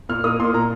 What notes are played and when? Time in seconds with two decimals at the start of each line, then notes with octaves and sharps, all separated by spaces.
0.09 A#2 F6
0.24 A#3 D#6
0.40 A#2 C6
0.54 A#2 A#5